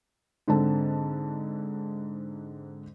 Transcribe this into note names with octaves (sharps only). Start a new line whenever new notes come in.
G#2 D3 C4 A5